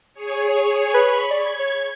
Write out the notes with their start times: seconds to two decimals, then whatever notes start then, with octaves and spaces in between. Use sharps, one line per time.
0.14 G#4 C#5
0.94 B4 B5 C#6
1.31 D5 G#6
1.59 C#5